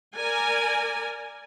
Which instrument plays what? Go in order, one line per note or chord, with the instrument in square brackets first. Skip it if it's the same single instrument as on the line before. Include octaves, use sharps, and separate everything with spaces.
[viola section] A#4 D5 G#5